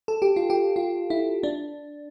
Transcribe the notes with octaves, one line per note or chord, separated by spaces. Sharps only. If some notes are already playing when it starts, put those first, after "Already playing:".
A4
G4
F4
G4
F4
E4
D4